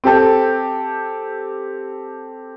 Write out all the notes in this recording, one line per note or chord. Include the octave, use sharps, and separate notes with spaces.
C4 G4 A4